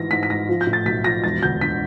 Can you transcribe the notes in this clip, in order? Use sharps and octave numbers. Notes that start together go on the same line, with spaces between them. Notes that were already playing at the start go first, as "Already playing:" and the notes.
Already playing: G#1 G#2 E3 A#6
G#2 B6
B6
G#2 A#6
F3
G6
A2
A6
B1 B6
F3 A#6
E1 A6
D2 G6
D3 B6